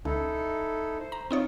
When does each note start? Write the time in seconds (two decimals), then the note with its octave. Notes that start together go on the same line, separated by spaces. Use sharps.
0.05 C#2 D#4 E4 A4
1.00 C5
1.12 A#5
1.31 C4 D#4 F4 C#5